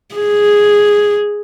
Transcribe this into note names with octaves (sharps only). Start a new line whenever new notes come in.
G#4